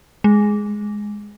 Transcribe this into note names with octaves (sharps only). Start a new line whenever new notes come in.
G#3